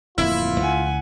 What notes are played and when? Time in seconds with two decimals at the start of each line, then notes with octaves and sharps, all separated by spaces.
0.18 D1 F2 A#3 E4 F4
0.60 C#2 F#5 G#5